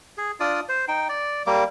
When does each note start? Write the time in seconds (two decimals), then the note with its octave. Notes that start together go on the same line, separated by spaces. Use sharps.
0.18 G#4
0.40 D4 F4 D5 D#6
0.69 C5
0.88 D#4 G5
1.09 D5
1.47 G3 A#3 D6